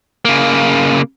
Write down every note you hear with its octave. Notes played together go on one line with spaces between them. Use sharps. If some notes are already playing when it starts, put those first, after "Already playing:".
C#3 A#3